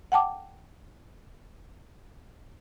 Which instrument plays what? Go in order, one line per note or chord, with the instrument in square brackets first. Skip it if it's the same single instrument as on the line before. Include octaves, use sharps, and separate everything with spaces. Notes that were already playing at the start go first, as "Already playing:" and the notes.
[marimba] F#5 G5 A5 D6